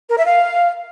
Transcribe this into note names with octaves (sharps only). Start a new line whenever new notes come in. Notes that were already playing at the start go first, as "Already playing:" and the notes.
A#4
E5
F5